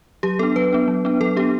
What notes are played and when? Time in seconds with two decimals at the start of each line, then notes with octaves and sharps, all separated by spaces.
0.23 F#3 G4
0.39 B3 D4 A4
0.56 F#3 B4
0.73 B3 D4
0.88 F#3
1.05 B3 D4
1.21 F#3 A4
1.37 B3 D4 G4